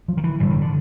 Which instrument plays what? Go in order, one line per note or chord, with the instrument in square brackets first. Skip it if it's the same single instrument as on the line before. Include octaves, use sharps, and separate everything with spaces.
[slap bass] F3
D#3
E3
G2 D3 E3
D#3
D3